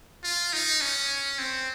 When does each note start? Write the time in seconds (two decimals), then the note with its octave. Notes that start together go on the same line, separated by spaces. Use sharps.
0.24 F4
0.53 D#4
0.81 C#4
1.38 C4